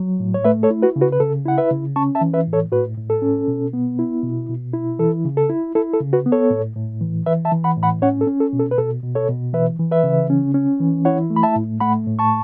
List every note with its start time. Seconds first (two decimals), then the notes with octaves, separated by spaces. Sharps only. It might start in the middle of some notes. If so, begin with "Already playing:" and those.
Already playing: F#3
0.20 A2
0.34 C#5
0.44 A3 B4 E5
0.63 A4 C#5
0.71 E4
0.82 F#4 B4
0.96 C#3
1.01 F#4 B4
1.12 B4
1.20 C#3 A4
1.45 E4 F#5
1.58 B4 E5
1.71 C#3
1.96 C#4 A5 C#6
2.15 E5 A5
2.21 E3
2.34 B4 E5
2.47 A2
2.53 A4 C#5
2.72 A2 F#4 B4
2.97 A2
3.10 A4
3.22 C#4
3.48 B2
3.73 B3
3.99 E4
4.23 B2
4.49 B2
4.74 E4
4.99 E3 A4
5.25 C#3
5.37 A4
5.50 E4
5.75 E4 A4
5.93 A4
6.00 C#3
6.13 F#4 B4
6.26 B3
6.32 A4 C#5
6.50 A2
6.76 A2
7.01 E3
7.26 E3 B4 E5
7.45 E5 A5
7.52 E3
7.64 F#5 B5
7.77 A2
7.83 F#5 B5
8.02 C#4 C#5 F#5
8.21 A4
8.27 C#4
8.40 A4
8.53 B2
8.60 A4
8.71 B4
8.78 B2 A4
9.03 B2
9.15 A4 C#5
9.29 B2
9.54 E3 B4 E5
9.79 E3
9.91 B4 E5
10.04 C#3
10.30 C#4
10.54 C#4
10.80 E3
11.05 E4 C#5 F#5
11.30 A3
11.36 B5
11.43 E5 A5
11.56 A2
11.80 A3 F#5 B5
12.07 A2
12.19 A5 C#6